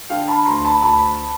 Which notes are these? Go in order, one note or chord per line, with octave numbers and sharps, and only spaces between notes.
D3 F5 G5
A5 B5
D2 A#5 C6
A5 B5
D2 A5 B5